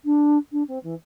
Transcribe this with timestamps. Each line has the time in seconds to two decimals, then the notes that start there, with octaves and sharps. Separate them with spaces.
0.04 D4
0.51 D4
0.67 C4
0.83 E3